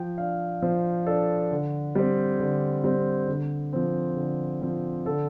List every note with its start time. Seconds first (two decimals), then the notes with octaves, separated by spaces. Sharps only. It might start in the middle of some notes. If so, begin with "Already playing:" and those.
Already playing: F3 G5
0.18 D4 F5
0.62 F3 C5
1.06 D4 A4
1.51 D3
1.95 G3 C4
2.40 D3
2.84 G3 C4
3.28 D3
3.73 F3 C4
4.17 D3
4.62 F3 C4
5.06 D3 A4